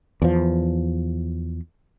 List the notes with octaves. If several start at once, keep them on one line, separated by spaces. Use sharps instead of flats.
E2 F3